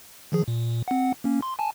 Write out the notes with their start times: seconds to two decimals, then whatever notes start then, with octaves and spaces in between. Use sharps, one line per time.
0.32 D#3 F3 G#4
0.48 A#2
0.88 C4 F#5
1.24 A#3 C#4
1.42 C6
1.59 G#5 A5